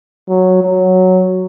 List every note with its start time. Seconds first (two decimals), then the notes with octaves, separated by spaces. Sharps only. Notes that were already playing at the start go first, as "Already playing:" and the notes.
0.28 F#3
0.62 F#3